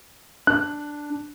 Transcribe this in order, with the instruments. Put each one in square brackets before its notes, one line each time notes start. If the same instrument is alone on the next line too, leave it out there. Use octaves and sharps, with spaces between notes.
[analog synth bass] D4 [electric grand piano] F#6